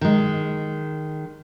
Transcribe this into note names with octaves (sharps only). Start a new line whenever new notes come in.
D#3 G#3